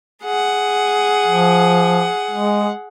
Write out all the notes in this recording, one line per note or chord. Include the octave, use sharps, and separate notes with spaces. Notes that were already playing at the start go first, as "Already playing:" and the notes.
G#4 F#5
F3
G#3